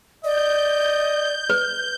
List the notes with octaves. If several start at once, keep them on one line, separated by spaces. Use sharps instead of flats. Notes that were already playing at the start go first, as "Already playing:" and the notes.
D5 D#5 G6
B4